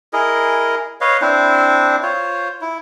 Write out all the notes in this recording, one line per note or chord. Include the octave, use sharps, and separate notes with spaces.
E4 G#4 A#4 D#5
B4 C#5 D#5 F5
C4 D4 E4 C5
F4 C5 C#5
E4